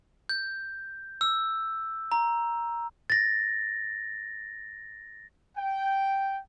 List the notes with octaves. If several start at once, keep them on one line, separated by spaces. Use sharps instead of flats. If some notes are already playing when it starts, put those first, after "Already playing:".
G6
E6
A#5
A6 A#6
G5